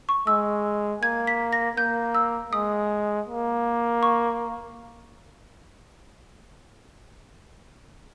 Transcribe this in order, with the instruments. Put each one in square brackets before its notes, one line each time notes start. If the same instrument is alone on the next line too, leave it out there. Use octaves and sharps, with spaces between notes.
[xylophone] C#6
[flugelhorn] G#3 [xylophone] E6
[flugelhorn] A#3 [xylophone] G#6
[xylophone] B6
A#6
[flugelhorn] A#3 [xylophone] G6
[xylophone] E6
[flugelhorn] G#3 [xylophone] D#6
[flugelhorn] A#3
[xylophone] C#6